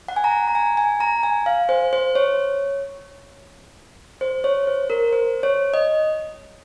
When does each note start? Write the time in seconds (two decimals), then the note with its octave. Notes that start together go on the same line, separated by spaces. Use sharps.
0.08 F#5
0.16 G#5
0.24 A#5
0.48 A#5
0.55 G#5
0.77 G#5
1.00 A#5
1.23 G#5
1.46 F5
1.69 C5
1.93 C5
2.15 C#5
4.21 C5
4.44 C#5
4.67 C5
4.90 A#4
5.13 C5
5.43 C#5
5.74 D#5